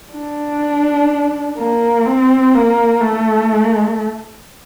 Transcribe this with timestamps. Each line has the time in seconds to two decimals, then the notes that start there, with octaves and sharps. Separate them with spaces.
0.13 D4
1.57 A#3
2.06 C4
2.54 A#3
3.01 A3